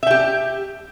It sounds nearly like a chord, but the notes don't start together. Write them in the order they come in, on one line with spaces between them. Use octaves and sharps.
E5 G5 G4